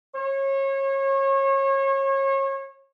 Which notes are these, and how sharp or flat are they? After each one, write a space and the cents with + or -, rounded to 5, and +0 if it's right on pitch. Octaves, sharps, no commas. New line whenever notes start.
C#5 -30